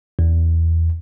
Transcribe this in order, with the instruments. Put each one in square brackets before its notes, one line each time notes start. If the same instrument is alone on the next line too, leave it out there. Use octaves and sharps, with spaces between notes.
[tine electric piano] E2